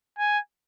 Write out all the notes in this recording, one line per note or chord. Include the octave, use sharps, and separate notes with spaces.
G#5